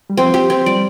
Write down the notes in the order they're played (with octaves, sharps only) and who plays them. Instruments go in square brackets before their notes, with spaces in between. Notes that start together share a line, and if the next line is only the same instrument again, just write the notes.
[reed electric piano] G3
[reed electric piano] F3 [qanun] C4
[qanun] G4
C4
[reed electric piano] G3 [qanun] D5